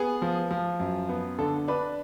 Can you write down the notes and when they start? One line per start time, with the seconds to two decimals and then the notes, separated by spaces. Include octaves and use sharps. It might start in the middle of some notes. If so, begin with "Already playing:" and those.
Already playing: B3 G#4
0.22 F3
0.51 F3
0.80 F#2
1.09 B3
1.39 D3 A4
1.68 D4 B4